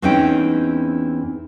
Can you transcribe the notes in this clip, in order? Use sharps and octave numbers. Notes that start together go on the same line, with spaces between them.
E2 C4 C#4 D#4 E4 G5